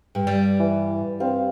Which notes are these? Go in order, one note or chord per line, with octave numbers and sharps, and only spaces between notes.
G2
G3
E3
G2 C4 F5